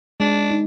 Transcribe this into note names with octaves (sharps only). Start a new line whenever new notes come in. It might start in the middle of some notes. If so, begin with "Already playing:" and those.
G#3 D4
D#4